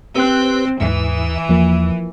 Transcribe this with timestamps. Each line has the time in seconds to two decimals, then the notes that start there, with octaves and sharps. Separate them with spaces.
0.16 C4 G4 B4 E6 F#6
0.80 D#2 G#2 E3 E5
1.49 E2 F3 A#3